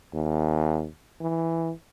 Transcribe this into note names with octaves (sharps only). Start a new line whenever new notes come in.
D#2
E3